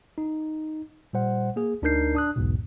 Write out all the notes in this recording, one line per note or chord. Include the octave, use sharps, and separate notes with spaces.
D#4
A#2 G3 C5 F#5
A#3 G#4
D2 D4 D#4 A#4 G6 C7
D4 D#6 F#6
B1 E2 G#2 B2